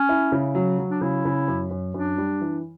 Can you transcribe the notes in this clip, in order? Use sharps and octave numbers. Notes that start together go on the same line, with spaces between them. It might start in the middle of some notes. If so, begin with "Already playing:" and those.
Already playing: C#4
E4
C#3
F#3
F#3
D4
C#3 E4
C#3
F#2
F#2
F#2 D4
G3
E3